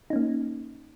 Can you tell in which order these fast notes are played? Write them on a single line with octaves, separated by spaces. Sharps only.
D#4 C#4 A#3